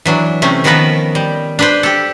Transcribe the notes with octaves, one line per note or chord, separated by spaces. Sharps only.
E3 F#3 D4
C3 A3 C#4
D#3 F3 B3 A#4 B4 A5
G3
D4 B4 C5
G4 A4